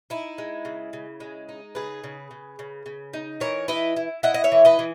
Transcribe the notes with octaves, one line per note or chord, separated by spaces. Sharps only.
D#4 E4
G#3
C#3
C#3
G#3
D#4
C#3 G#4 B4
C#3
C#3
C#3
C#3
D#4
E3 A#4 C#5
E4 B4 D#5
E4
E4 D#5 F#5
D#5
C#5 E5
E3
B4 D#5
E3